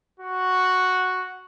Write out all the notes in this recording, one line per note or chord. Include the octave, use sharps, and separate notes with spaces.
F#4